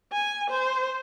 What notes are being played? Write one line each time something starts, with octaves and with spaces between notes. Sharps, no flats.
G#5
C5